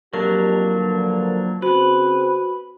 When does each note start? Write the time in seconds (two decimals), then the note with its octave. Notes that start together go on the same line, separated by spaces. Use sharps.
0.13 F2 F#3 A#3 D4 G4 A#4
0.73 G2 D3 F3
1.62 C#3 C4 F#4 B4 C5